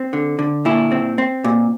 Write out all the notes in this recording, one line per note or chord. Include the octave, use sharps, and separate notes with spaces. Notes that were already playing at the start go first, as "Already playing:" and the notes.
Already playing: C4
D3
D3
A#2 E4
C4
C4
A#2